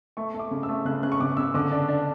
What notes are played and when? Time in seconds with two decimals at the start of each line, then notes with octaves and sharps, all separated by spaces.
0.17 A3 C#6
0.34 A3 D6
0.51 C#3
0.63 E6
0.69 A3
0.85 C#3 F#6
1.03 C#3 F#6
1.12 C#6
1.20 C#3 D6
1.37 C#3 E6
1.54 D3 D6
1.71 D4
1.89 D4